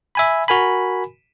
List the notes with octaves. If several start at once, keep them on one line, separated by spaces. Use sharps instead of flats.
E5 G#5 B5
F#4 A#4 G#5 B5